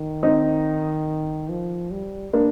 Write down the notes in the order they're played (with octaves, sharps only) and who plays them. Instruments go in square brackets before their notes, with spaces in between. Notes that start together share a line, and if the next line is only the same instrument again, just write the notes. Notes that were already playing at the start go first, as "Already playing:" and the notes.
Already playing: [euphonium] D#3
[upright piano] C4 D#4
[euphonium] F3
G3
[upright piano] A#3 D4